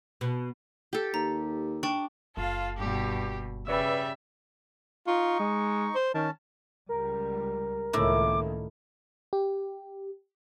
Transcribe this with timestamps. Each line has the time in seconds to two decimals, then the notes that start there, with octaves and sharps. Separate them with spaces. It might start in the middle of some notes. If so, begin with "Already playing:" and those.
0.21 B2
0.93 G4 A4
1.14 D#2 A#5
1.83 D4 G5 C#6
2.37 F#1 F4 A4 F5
2.78 G2 B2 G4
3.67 C#3 G3 B4 D5 E5 E6
5.07 D#4 F4 C#6
5.40 G#3
5.95 C5
6.14 D#3 C#4 A5
6.89 C#2 G3 A#4
7.93 C#2 A2 D#3 A#3 E4 D6
9.33 G4